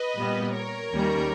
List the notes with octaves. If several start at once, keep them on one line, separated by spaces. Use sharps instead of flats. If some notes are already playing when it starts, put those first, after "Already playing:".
Already playing: B4 D#5
A#2 G3 B3
A#4 C#5
D#2 D#3 G3 A#3 C#4